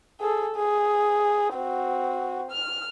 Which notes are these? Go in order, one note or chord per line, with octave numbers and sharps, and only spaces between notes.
G#4 A4
G#4
C4 F#4
F6